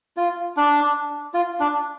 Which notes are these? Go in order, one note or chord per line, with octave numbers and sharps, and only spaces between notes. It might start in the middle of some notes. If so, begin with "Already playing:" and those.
F4
D4
F4
D4